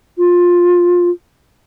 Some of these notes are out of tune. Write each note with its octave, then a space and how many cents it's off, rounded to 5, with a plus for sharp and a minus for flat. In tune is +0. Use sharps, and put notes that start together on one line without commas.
F4 +15